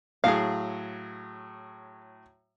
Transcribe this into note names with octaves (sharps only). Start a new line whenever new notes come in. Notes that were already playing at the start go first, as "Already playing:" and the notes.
A2 F#3 G#4 F5